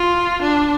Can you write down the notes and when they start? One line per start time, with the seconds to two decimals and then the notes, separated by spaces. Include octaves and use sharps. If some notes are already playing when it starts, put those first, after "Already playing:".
Already playing: F4
0.42 D4